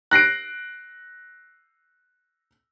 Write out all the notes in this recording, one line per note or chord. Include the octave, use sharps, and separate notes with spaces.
F#6 A#6 C7 D7